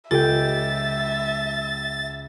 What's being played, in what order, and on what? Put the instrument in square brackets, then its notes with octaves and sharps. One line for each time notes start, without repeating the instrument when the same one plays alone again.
[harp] C#2 G5 [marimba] F4 G4 A4 [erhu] E5 [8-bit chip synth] A6